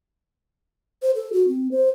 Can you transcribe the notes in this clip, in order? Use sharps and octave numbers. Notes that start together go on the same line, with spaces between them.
C5
A4
F#4
C4
C5